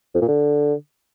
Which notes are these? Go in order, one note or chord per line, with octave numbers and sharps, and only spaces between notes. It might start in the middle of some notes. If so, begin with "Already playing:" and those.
F2
A#2
D3